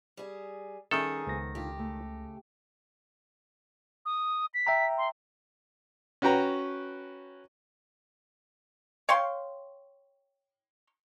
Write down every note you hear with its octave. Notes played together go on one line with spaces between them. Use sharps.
G3 G#4
D#3 G3 C#4 D#4 G#4 A4 E5
C#2 B3 C5 A#6
D3 D#4 F4 G4
C#3 A3
D#6
B6
E5 G5 A#5
C6
C#4 F#4 B4 G5 A#5
C#5 F5 G5 C6